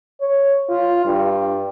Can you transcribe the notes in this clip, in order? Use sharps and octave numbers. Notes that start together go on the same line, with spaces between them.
C#5
F4
G2